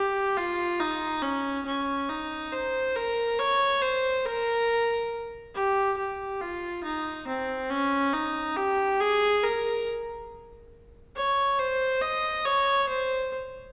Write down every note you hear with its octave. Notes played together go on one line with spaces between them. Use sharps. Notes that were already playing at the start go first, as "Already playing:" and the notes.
Already playing: G4
F4
D#4
C#4
C#4
D#4
C5
A#4
C#5
C5
A#4
G4
G4
F4
D#4
C4
C#4
D#4
G4
G#4
A#4
C#5
C5
D#5
C#5
C5